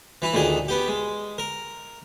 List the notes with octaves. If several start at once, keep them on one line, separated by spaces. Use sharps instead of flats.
E3 E4
D2 A#2 D#3 G#4
B3 G4
G#3
A#4